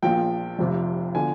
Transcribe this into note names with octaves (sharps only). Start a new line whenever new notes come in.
A#1 A#2 F3 G5
F1 F2 C3
D3 F3 G#5